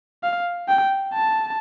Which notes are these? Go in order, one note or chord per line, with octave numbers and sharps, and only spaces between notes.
F5
G5
A5